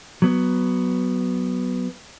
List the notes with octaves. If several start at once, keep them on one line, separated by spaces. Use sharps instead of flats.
F#3 B3